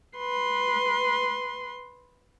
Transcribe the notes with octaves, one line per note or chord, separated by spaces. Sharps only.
B4 C6